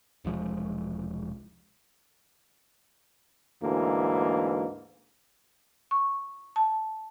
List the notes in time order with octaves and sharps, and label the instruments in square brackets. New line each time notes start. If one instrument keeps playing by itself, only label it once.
[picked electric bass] E1 C2 F3 G#3
[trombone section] D2 G#2 E3 A#3
[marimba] C#6
A5